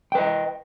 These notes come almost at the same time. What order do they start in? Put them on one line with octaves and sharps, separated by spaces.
G5 B4 D#5